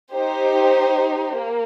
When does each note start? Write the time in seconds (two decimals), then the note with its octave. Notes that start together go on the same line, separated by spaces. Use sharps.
0.12 D#4 G4 C5
1.35 A#3